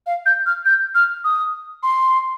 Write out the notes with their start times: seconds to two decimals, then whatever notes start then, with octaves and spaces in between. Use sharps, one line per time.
0.07 F5
0.26 G6
0.46 F6
0.65 G6
0.95 F6
1.24 D#6
1.83 C6